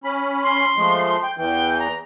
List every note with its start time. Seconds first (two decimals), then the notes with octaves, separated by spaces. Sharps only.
0.04 C#4 B5
0.43 C6
0.77 F3 G#3 A3
1.22 G5
1.37 E2 E3 G5
1.79 A#5